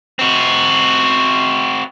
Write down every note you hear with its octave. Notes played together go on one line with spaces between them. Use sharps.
C4 F#4